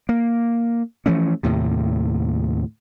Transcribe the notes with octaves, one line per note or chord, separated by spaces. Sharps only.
A#3
E3 F3 A3 C#4
D#2 A2 C3